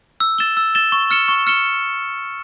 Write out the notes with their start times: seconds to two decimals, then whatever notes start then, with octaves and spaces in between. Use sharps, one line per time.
0.20 E6
0.38 A6 E7 G7
0.57 E6
0.75 A6 E7 G7
0.92 C#6
1.11 F6 C#7 E7 G7
1.28 C#6
1.47 F6 C#7 E7 G7